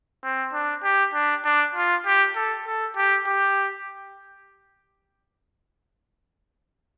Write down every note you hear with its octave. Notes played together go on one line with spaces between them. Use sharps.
C4
D4
G4
D4
D4
F4
G4
A4
A4
G4
G4